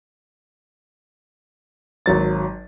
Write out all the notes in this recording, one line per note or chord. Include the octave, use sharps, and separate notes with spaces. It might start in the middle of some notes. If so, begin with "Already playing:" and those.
G#1 F#3 A6